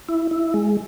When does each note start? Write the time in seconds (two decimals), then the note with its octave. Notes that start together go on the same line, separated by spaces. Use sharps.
0.09 E4
0.31 E4
0.54 G#3